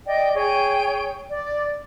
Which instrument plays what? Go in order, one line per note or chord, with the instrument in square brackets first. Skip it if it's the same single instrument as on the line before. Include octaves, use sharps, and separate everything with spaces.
[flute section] D5 D#5 G5
G#4 C#5 G5
D5